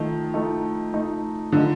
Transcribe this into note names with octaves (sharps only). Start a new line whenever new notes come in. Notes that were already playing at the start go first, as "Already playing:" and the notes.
Already playing: D#3 F3 A3 D#4
F3 A3 D#4
F3 A3 D#4
D3 F3 A3 D#4